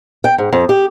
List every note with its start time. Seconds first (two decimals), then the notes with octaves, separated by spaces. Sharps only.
0.24 G5
0.38 G#2
0.53 F2
0.69 G4